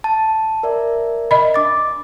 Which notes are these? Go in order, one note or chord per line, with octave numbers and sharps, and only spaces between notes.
A5
A#4 D5 E5
D#5 B5
D4 D6 A6